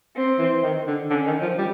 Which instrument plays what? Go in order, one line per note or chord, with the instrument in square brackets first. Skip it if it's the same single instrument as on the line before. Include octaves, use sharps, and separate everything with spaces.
[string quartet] C4
[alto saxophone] E3
D#3
D3
[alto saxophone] D3 [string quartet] C#4
[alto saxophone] D#3
F3
G3